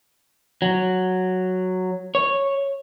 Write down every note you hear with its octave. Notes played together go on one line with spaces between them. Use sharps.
F#3
C#5